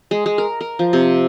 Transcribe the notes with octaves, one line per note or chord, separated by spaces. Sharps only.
G#3
G#3
A#4
A#4
F3
C3